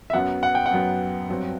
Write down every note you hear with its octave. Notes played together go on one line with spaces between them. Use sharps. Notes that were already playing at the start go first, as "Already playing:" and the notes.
E5
F#2 F#3 B3 F#5
F#5
G5
F#5
F#2 F#3 B3
G2 F#3 C4